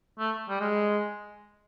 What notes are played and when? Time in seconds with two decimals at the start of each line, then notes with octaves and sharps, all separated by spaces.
0.19 A3
0.49 G3
0.60 G#3